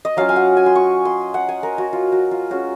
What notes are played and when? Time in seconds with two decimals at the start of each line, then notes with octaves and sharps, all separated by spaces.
0.05 D#5
0.17 F#3 C#4 F4 F5
0.29 G#5
0.36 F#5
0.57 G#5
0.66 C6
0.76 C#6
1.05 C6
1.34 F#5
1.49 G#5
1.63 A#4
1.78 F#4
1.93 F4
2.12 F#4
2.31 F4
2.50 G#3 C#4 F4 F#4